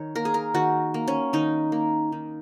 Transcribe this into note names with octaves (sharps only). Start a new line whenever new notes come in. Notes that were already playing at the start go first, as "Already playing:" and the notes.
Already playing: D#3 C#5
A#3 A#4
G#4
A#4
D#3 F#4
A#3
C#4
D#3 D#4
A#3
D#3